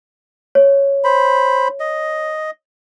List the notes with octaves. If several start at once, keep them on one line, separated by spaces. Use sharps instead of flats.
C#5
C5 B5
D#5